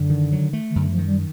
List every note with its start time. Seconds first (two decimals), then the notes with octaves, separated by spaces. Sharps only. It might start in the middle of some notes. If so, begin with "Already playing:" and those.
Already playing: F#2 D3
0.10 D#3
0.32 F#3
0.53 A3
0.70 D#3
0.76 F#2 D3
0.91 F3
0.98 D#3
1.06 G3